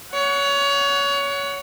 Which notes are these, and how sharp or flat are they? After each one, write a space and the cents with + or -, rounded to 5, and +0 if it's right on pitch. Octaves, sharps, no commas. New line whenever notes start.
C#5 +25 F#5 -5